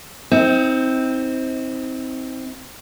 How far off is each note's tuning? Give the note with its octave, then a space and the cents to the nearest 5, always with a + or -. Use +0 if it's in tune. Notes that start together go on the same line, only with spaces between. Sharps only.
C4 +0 D#4 +35